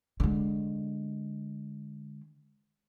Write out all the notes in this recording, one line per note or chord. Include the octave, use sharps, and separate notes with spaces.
D3 G#3